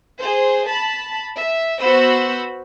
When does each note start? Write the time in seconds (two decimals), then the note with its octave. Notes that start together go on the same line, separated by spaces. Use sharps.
0.19 G#4 C5
0.69 A5 B5
1.37 E5
1.81 B3 F#4 C5 B5 E6